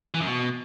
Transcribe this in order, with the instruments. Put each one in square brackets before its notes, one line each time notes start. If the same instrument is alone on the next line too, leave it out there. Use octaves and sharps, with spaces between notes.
[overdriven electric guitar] E3
F#2
B2